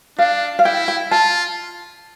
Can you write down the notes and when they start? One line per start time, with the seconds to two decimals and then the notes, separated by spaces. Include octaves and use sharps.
0.18 D4 F5
0.59 F5
0.65 E4 G5
0.88 G5
1.11 F4 A5